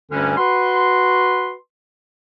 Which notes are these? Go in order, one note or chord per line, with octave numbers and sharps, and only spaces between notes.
D2 G2 D3 G3 C#4
F#4 B4 C6